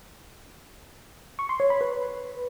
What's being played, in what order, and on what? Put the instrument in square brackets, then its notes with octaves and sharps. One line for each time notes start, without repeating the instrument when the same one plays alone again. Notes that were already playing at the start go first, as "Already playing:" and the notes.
[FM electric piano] C#6
C6
C#5
B5
B4